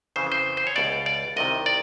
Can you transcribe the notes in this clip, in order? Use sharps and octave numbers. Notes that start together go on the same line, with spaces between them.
F2 C#3 E3 C5
C5
C5
C#5
C#2 B2 D5
D5
C2 C3 D#3 D#5
D5